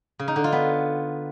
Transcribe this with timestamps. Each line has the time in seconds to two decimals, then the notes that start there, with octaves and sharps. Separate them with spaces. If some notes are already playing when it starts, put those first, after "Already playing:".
0.19 C#3
0.28 D#4
0.36 D3
0.44 F4
0.52 B3